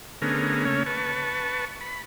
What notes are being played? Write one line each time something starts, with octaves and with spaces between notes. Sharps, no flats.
D3 A3 B3 C#4 G#4 A#4
C#3 A3 A#3 C#4 C#5
B4 A5 C#6
B5